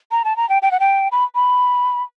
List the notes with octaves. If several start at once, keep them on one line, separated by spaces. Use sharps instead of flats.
A#5
A5
A#5
G5
G5
F#5
G5
B5
B5